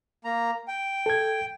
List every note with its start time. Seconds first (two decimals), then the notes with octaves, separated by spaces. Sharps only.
0.24 A#3 A#5
0.68 G5
1.06 A4 G#6